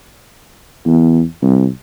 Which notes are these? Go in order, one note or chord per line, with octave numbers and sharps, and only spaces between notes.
E2
C2